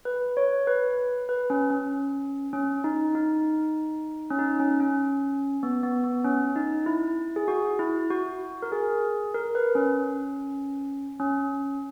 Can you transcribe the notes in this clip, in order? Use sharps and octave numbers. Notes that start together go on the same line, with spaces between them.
B4
C#5
B4
B4
C#4
C#4
C#4
D#4
D#4
C#4
D#4
C#4
C#4
B3
B3
B3
C#4
D#4
E4
G#4
F#4
E4
F#4
A#4
G#4
A#4
B4
C#4
C#4